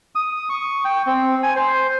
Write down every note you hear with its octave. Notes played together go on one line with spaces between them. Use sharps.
D#6
C#6
G5
C4
G#5
C5